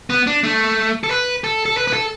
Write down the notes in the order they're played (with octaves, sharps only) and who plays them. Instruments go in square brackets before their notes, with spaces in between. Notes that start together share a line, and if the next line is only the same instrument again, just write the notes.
[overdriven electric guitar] B3
D4
A3
A4
B4
A4
A4
B4
B4
A4